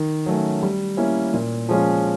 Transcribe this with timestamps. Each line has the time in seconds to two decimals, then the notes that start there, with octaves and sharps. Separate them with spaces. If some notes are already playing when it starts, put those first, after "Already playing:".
Already playing: D#3
0.26 F#3 A3 C#4
0.63 G3
0.97 A#3 C#4 E4
1.34 A#2
1.69 F3 G#3 C#4 F4